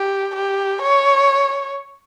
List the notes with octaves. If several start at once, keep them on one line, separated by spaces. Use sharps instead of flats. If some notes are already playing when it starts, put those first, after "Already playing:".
Already playing: G4
G4
C#5